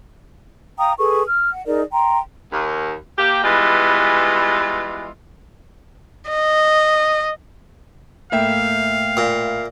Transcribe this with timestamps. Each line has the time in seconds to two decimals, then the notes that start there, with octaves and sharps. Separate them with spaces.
0.78 F5 G5 A#5 D#6
0.99 G#4 A4 B4 C#6
1.27 F6
1.51 F#5
1.66 D#4 G#4 A#4 D5
1.92 G5 A#5 C6
2.52 D#2
3.18 A#3 G4
3.43 E3 G3 G#3 B3 F4
6.29 D#5
8.32 A2 A#3 E5 F5 G5
9.17 A#2